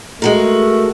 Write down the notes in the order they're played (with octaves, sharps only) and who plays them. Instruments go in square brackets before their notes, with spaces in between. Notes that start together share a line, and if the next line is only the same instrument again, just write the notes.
[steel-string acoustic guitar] G#3 F#4 A#4 [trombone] A3